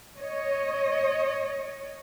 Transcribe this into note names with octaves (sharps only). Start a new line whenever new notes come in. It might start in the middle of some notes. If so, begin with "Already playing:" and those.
C#5 D#5